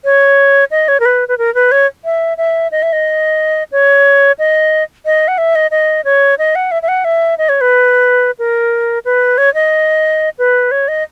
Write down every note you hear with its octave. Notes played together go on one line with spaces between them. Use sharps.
C#5
D#5
C#5
A#4
B4
B4
A#4
B4
C#5
E5
E5
D#5
E5
D#5
C#5
D#5
D#5
F#5
E5
D#5
D#5
C#5
D#5
F#5
E5
E5
F#5
E5
D#5
C#5
B4
A#4
B4
C#5
D#5
B4
C#5
D#5